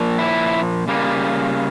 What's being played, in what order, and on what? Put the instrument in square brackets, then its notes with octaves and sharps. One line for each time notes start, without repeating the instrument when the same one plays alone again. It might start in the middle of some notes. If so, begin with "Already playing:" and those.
Already playing: [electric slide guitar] A#2 F3 A#3
E4
C#3 G3 A#3